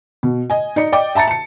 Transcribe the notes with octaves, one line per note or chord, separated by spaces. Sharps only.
B2
D#5 G#5
D#4 D5 C#7
D5 D#5 G5 D6
E5 A5 A#5 A6 C#7
A5 C#7